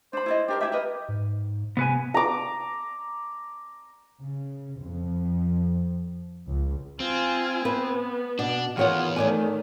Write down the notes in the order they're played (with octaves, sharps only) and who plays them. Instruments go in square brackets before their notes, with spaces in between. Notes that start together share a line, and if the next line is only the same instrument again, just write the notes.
[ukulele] D4 B5 [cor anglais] C5
[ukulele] E4 D5 D#5
[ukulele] D4 A#4 C5 [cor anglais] G4
[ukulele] E4 G#4 E5 [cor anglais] G4
[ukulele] A#4 B4 D#5
[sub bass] G#2
[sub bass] C3 [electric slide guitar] B3 B4 G#5
[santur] A#5 D6
[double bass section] C#3
F2
C#2
[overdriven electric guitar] C4 [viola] F4 G#5
[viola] B3 [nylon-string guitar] B4
[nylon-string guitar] B2 [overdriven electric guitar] D4
[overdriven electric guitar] E2 B3 [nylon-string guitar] D#3 C#5 F#5 [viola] F4 G#4
[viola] D#3 A3 [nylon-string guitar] C#5 D5 G#5